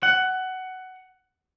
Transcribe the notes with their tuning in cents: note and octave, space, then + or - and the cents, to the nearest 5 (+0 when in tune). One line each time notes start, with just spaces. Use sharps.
F#5 +15